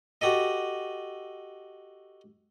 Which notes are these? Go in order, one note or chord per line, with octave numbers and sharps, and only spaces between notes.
F#4 G4 A4 D#5